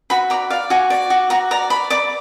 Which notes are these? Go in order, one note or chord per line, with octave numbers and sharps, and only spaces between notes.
F#4 B5
D5 A#5
D5 F5
F#4 G#5
D5
F#4
F#4 A#5
D5 A#5
D5 B5
D5 D6